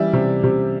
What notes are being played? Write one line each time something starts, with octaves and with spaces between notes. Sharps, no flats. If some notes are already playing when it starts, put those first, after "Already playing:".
Already playing: E3 G3 D5 E5
C3
C3